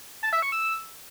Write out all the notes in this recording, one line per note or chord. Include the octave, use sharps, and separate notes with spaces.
A5
E5
C#6
E6